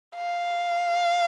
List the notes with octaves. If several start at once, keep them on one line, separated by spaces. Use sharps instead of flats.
F5